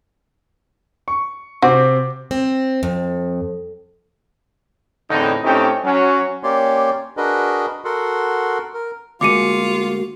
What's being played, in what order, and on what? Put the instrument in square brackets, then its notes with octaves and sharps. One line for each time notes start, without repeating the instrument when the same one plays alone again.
[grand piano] C#6
[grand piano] C3 C4 D6 [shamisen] F#4
[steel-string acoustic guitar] C4
F2
[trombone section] E2 A2 D3 C4 D#4
A2 A3 C4 C#4 D#4 G4
F#3 C#4
[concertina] A#3 C#4 G4 C#5 D5 C6
D4 F#4 G#4 A#4 B4 D#5
F#4 A4 A#4 F#5 C6
A#4
[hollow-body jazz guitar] D2 G#3 A#3 [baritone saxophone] F4 [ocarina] F#4 [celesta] D6 C#7 D#7